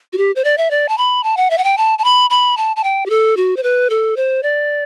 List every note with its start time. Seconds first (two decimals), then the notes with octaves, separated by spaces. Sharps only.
0.13 F#4
0.18 G4
0.36 C5
0.44 D5
0.58 E5
0.71 D5
0.89 A5
0.98 B5
1.24 A5
1.37 F#5
1.50 E5
1.58 F#5
1.64 G5
1.78 A5
1.99 A5
2.04 B5
2.30 B5
2.57 A5
2.76 A5
2.84 G5
3.06 G4
3.10 A4
3.37 F#4
3.57 C5
3.63 B4
3.90 A4
4.16 C5
4.43 D5